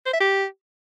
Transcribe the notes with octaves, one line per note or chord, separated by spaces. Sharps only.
C5
E5
G4